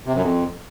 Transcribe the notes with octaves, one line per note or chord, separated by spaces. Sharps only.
C3
F#2
F2